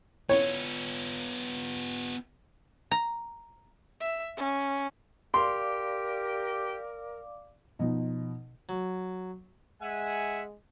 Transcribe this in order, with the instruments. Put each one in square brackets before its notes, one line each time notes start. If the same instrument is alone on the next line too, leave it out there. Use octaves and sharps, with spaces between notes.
[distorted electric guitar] B3 F4 [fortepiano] C#5
[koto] A#5
[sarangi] E5
C#4
[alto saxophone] G4 [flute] A#4 [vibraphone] D5 F5 D6 [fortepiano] C6
[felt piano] B2 F3 D#4
[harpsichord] F#3
[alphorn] G#3 [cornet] E5 [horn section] F#5 G#5